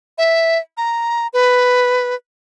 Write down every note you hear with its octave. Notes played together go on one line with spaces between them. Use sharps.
E5
A#5
B4